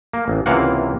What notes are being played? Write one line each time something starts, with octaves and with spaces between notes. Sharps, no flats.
A#3
A1
C#2 C3 E3 A#3 F5 F#5